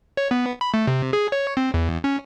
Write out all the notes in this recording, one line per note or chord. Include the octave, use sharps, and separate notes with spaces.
C#5
B3
B5
A3
C3
G#4
C#5
C4
E2
C#4